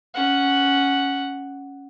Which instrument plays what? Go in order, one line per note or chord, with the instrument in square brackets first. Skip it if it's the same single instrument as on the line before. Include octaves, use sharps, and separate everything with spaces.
[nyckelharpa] C#4 F#5